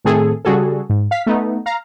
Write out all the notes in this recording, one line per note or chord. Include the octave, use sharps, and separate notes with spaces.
A2 D#3 A3 C4 G#4 A4
C#3 G3 F#4 G#4 A4
G#2
F5 B6
A3 B3 D#4
F5 A#5